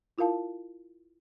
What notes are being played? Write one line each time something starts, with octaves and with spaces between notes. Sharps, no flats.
E4 F4 A#4 F5 A5